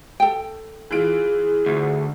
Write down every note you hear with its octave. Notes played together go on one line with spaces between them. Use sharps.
A4 G5
E3 F4 G#4 D7
D2